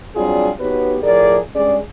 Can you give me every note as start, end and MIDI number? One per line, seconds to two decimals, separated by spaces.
0.16 0.50 54
0.16 0.50 55
0.16 0.50 60
0.16 0.50 62
0.16 0.50 65
0.16 0.50 68
0.60 0.97 59
0.60 0.97 63
0.60 0.97 66
0.60 0.97 67
0.60 0.97 71
0.60 0.97 73
1.03 1.38 45
1.03 1.38 53
1.03 1.38 68
1.03 1.38 70
1.03 1.38 74
1.55 1.77 43
1.55 1.77 56
1.55 1.77 61
1.55 1.77 68
1.55 1.77 74